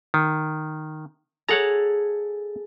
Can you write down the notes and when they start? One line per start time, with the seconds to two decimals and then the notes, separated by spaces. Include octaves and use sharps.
0.14 D#3
1.49 G#4 A4 C#5 F#5 A5 A#5